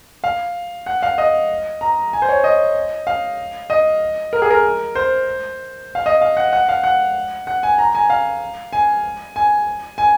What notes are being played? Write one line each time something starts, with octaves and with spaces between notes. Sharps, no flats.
F5
F#5
F5
D#5
A#5
G#5
C5
C#5
D#5
F5
D#5
A#4
G#4
A#4
C5
F5
D#5
F5
F#5
F#5
F5
F#5
F#5
G#5
A#5
G#5
F5
G#5
G#5
G#5